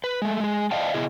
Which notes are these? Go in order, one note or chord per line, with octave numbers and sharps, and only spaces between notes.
B4
G#3 A3
G#3 G#4
D5 D#5 F5 G5 A5
C#3 B3 E4 G#4 D#5